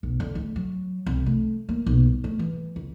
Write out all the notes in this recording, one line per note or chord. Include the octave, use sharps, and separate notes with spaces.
B1
D3
D2
F#3
C2
A3
A#3
B1
G3
A3
E3
C#2